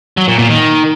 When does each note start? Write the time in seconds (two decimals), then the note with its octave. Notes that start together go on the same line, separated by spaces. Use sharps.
0.18 F#3
0.28 A#2
0.39 A#2
0.49 D#3